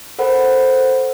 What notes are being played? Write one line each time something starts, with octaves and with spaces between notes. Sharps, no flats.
A4 A#4 C5 F#5 B5